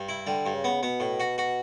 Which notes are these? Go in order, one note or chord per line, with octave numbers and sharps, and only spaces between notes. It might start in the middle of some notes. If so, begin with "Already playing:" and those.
Already playing: G2
E4
D3 G3
G2
C#3
B3
B2 B3
A2
F#4
F#4